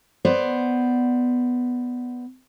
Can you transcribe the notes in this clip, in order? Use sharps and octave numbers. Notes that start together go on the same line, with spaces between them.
B3 C5 D5